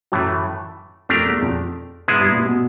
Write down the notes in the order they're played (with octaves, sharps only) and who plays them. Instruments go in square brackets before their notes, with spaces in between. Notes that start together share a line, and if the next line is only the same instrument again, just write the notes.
[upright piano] F#2 [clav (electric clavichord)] A2 E3 A3
[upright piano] F2 [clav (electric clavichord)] A3 D4 G4 A#4
[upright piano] E2
E2
F2
[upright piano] G#2 [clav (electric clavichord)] G#3 B3 E4 G#4
[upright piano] G2
A#2
B2